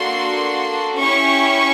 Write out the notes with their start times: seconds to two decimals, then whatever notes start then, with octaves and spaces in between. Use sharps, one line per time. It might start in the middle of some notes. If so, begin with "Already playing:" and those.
Already playing: A#3 D4 F#4 A4 C6
0.99 C#4 E4 G4 C#6